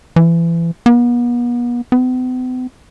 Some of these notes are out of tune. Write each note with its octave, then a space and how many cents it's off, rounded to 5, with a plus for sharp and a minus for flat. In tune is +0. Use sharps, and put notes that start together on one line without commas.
E3 +30
B3 -40
B3 +45